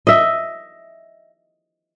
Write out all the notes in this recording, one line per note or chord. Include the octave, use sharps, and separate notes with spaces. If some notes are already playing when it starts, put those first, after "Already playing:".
D#5 E5